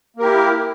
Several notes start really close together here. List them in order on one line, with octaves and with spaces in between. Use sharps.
A#3 A#4 G4 E4